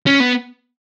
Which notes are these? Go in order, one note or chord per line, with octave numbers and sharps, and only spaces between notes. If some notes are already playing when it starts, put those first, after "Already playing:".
C#4
B3